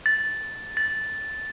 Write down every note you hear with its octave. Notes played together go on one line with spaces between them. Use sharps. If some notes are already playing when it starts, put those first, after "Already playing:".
A6
A6